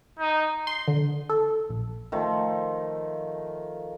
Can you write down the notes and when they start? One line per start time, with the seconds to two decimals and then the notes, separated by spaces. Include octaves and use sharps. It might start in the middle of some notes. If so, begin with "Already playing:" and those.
0.19 D#4
0.67 C6
0.88 D3
1.29 A4
1.70 A#1
2.12 D#3 F3 A3